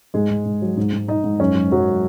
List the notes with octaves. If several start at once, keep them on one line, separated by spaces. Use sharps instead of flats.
G#2 G#3 G#4
G#2
G#2
F#3
G#2
G#2
G#2 D#4 D#5
G#2
F#2 C#4
F#2
F#2 F#3 F#4